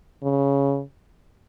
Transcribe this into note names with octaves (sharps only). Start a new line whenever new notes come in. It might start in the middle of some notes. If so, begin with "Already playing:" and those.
C#3